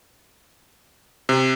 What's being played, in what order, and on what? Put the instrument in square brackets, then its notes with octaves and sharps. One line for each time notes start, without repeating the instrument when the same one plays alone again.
[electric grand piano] C3